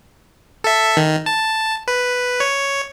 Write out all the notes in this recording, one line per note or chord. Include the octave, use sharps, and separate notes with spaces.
A4 E5
D#3
A5
B4
C#5